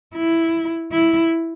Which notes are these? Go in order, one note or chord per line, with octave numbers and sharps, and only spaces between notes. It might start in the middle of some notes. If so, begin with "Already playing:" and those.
E4
E4